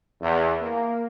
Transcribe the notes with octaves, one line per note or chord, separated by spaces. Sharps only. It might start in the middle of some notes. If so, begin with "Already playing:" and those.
E2
A#3